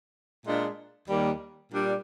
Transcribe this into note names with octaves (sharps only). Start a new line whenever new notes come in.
A#2 G#3 D4
D#2 D#3 G3 A#3
A#2 G3 D4